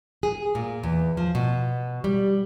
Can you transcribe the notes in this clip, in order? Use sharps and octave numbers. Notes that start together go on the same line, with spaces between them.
G#4
A#2
E2
F3
B2
G3